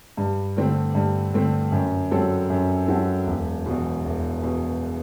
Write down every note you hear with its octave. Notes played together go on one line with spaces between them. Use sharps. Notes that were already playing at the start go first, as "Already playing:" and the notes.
G2
D3 A3 C4
G2
D3 A3 C4
F#2
F#3 C4 F#4 A4
F#2
F#3 C4 F#4 A4
E1
E2 B2
E1
E2 B2